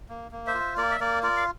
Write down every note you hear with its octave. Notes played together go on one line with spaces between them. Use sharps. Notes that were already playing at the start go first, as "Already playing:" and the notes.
A#3
A#3
C5 E5
F4
A#3 A#4 D5
E5
A#3 A#4 D5
F4 A#4 D5
F5